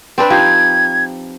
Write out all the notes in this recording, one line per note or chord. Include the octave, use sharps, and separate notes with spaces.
C4 D4 B4
F3 D#4 G4 G#6